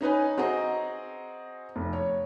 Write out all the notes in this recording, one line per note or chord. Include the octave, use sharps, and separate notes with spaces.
C#4 D#4 B4 G#5
C4 F#4 G#4 D#5 A#5
F1
C#5